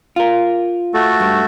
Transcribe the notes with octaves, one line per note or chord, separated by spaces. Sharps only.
F4 A#4
A3 F#4 A4
G2